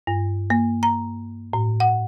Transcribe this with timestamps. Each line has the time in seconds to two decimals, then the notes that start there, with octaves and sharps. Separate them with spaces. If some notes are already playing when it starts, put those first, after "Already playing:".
0.07 G2
0.50 A#3
0.83 A#5
1.53 A2
1.80 F#5